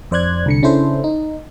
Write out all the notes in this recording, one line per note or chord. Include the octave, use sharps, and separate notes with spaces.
F2 C5 D5 F#6 G#6
C2 D3 C#7
C#3 C#4 D4 E4 A4 C5
D#4